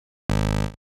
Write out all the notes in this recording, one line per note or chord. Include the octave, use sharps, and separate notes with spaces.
G#1